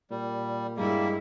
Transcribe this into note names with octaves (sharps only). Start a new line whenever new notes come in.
A#2 G3
G2 G3 G#3 A#3 E4